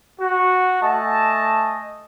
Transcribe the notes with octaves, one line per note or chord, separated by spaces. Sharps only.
F#4
A3 D#5 G#5 A5